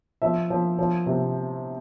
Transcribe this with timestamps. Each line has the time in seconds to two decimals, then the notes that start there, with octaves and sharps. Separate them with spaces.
0.22 F3 E5
0.50 F3
0.79 F3
1.06 C3